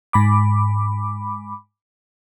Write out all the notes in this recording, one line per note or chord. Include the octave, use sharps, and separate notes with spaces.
G#2 B5 D6